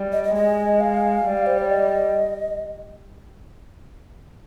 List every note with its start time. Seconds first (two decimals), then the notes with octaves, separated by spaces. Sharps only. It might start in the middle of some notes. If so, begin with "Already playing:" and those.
Already playing: G3
0.12 D#5
0.24 D#5
0.35 G#3 D#5
0.80 F5
1.25 G3
1.46 C5
1.58 D5
1.70 D#5